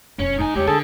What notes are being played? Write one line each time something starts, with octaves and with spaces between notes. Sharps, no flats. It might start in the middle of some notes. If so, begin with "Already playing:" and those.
E1 F2 C#4
G#2 D#4 G#5
E2 G#3 D4 G4 C#5
D3 D#4 G#4 A4